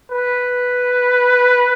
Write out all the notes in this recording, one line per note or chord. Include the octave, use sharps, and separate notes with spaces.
B4